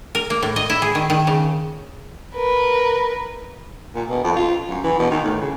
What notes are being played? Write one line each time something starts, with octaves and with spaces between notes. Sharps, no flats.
A#4
A#3
A2
D#5
E4
G#4
D#3
D#3
C#3
A#4 B4
A#2
B2
F2
F4
F#2
E3
B2
D#3
A2
C#3